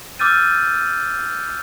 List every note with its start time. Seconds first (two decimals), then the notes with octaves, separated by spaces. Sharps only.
0.19 D6 E6 F6 G6 A6 D#7